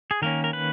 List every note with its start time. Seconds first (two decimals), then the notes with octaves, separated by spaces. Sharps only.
0.11 G#4
0.22 D#3 A#3 C#4 A#4
0.44 A#4
0.53 B4